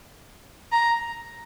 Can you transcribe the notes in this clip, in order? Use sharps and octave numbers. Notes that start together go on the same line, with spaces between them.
A#5